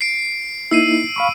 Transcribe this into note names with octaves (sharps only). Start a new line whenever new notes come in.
C7 D7
A#3 D#4 E4 E6 C7 D#7
F5 B5 C#6